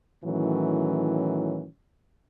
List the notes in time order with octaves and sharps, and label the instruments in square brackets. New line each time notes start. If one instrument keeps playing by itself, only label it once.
[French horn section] A2 D#3 E3 F#3 C#4